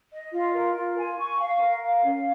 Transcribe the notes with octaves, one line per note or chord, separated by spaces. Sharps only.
D#5
F4
A#4
F4
G#5
C#6
F5
A#4
F5
C#4